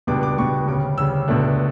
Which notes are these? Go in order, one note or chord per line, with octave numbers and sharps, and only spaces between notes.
C#2 B2 G3 D4 D6
D6
C#2 B2 G3 D4 C#6
D2 C#3 G3 D6
D2 C#3 G3 E6
C#2 B2 A3 D4